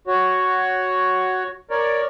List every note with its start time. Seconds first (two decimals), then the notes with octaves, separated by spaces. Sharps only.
0.07 F#4 C#5
1.71 A#4 C#5 D5